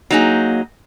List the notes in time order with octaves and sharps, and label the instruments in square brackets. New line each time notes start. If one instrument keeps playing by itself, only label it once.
[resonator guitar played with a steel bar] F#3 D#4 G#4 [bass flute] A#3